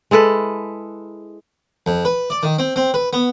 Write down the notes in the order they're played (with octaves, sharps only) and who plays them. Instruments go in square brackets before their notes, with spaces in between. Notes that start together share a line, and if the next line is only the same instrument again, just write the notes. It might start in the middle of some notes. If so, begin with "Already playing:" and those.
[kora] G#3 E4 A4 B4
[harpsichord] F2
B4
D5
D#3
C4
C4
B4
B3